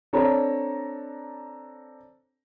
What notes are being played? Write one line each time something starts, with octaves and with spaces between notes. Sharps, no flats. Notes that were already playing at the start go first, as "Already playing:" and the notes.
C4 D4 A4 C#5 A#5